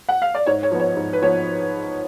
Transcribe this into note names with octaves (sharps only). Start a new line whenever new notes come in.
F#5
F5
D5
G#2 C#5
C#5
F3 B3
C#5
G#2
B4
F3 B3 C#5